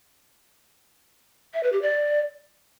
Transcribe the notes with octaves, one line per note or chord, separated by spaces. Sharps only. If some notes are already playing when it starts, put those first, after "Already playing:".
E5
B4
G4
D5